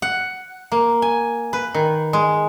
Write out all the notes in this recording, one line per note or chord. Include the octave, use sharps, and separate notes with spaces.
F#5
A#3
G#5
B4
D#3
G#3